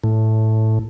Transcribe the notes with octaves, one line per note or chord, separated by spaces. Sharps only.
A2